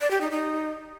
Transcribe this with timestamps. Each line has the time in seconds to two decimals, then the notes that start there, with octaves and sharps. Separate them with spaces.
0.01 D5
0.11 G4
0.21 D#4
0.31 D#4